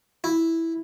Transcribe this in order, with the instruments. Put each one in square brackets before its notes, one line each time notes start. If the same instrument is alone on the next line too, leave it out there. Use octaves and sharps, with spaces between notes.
[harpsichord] E4